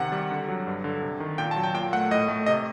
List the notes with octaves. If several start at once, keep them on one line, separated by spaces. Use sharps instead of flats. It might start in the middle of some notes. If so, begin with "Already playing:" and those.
Already playing: C3 D#3 F#5
G3
D3
F#3
G2
D3
C3
D#3
A#2 G5
A5
F#3
G5
A#2 G5
A3 F#5
A2 D#5
A3
C3 D#5